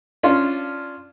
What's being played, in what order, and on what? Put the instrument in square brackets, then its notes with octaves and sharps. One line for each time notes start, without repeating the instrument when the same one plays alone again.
[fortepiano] C#4 D4 F4